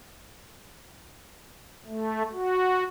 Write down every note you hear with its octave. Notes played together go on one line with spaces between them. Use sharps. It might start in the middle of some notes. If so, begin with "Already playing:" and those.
A3
F#4